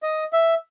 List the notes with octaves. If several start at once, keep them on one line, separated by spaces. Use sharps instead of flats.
D#5
E5